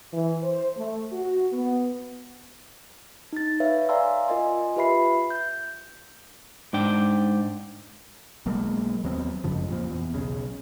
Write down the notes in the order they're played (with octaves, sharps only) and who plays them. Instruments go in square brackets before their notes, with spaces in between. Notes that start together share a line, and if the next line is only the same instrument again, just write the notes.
[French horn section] E3
C5
A3
F#4
B3
[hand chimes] D#4 A6
B4 C#5 E5 F5
D5 F5 G#5 A#5 C6 E6
F4 A#4 D#5 G#5 C6
F4 G4 B4 E5 B5 C7
G6
[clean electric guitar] G#2 D4 G5
[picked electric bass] B1 F#3 G#3 A#3
D#2 F#3 B3 C4
G#1 F#2 C#3 F3
F2 A#2 F3
E2
B1 C#3